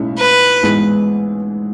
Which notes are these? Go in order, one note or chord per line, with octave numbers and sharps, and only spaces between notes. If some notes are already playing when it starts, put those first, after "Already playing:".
Already playing: B1 A2 G#3 C#4 E4
B4
A1 G#2 E3 G#3 B3